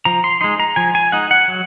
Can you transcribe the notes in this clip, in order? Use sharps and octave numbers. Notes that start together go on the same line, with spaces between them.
F3 A#5
C6
G#3 D#4 C6
A#5
F3 G#5
G#5
G#3 D#4 F#5
F#5
F#3